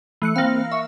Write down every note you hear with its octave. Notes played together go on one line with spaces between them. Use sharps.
E3 A3 F#6 C#7
A#3 C4 F5
E5 C#6